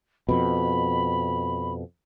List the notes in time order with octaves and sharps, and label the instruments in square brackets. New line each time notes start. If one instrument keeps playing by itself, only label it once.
[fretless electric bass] F2 B2 [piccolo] B5